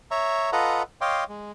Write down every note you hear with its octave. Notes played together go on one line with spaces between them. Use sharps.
C#5 E5 A#5 C#6
F4 A4 B4 D#5 F#5 A#5
C#5 D#5 F5 G5 C6 D6
G#3